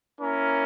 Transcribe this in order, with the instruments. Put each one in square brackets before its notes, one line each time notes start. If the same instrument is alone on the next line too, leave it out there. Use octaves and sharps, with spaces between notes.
[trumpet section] A#3 C#4 E4 A#4